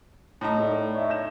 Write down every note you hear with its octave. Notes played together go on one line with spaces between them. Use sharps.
A2 D#4 A#5
A3 D5
C#5 D#5 E5
G6 A#6 E7